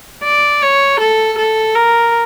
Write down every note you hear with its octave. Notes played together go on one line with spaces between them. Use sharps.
D5
C#5
A4
A4
A#4